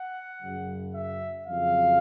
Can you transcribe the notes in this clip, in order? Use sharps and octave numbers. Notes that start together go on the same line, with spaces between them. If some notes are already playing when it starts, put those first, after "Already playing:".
Already playing: F#5
F#2 C#3 F#3
E5
F2 C#3 F#3 F5